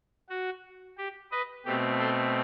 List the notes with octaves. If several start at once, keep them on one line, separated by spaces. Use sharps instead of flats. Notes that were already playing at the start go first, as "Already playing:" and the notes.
F#4
G4
B4 D#5
B2 A3 C4 G4
A4 C5